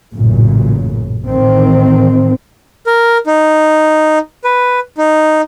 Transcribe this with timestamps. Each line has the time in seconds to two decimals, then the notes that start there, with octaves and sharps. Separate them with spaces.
0.13 A1 F#2 A#2 C#3
1.28 A1 D#3 C4
2.87 A#4
3.27 D#4
4.44 B4
4.98 D#4